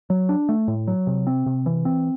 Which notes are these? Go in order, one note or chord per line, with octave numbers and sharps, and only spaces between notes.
F#3
D4
A3
A2
F#3
C3
C4
C3
E3
C4